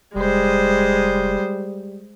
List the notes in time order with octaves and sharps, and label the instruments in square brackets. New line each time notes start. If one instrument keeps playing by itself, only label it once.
[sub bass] F1 [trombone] G3 [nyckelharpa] G#3 C5